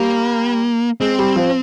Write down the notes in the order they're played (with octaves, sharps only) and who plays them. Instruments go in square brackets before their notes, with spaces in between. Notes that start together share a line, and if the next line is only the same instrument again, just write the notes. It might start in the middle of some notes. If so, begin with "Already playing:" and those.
Already playing: [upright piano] G3 [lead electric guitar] A#3
[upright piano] G#3 [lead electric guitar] C4
[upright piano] G3
F3